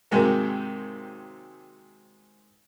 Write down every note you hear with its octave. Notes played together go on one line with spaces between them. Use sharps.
G#2 C3 D#3 F#3 G#3 A#3